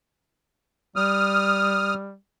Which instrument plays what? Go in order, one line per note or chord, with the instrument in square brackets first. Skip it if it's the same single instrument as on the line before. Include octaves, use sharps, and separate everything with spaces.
[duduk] G3 [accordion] D#6 F6